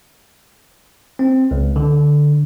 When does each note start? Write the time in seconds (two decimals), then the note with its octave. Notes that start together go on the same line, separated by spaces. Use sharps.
1.19 C4
1.51 C#2
1.76 D3